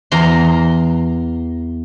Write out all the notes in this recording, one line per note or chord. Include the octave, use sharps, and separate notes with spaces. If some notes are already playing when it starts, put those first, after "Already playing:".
E2 A#5 C6